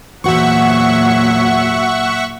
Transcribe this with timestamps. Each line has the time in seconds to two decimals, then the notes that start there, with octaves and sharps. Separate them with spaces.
0.24 E2 A#2 F#3 F#4 C5 E5 F#5 C#6